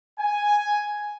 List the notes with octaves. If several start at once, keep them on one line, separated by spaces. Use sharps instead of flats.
G#5